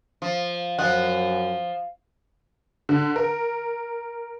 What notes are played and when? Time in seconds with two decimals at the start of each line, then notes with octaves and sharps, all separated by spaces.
0.22 F3
0.79 F#2 F3 F#5
2.89 D3
3.16 A#4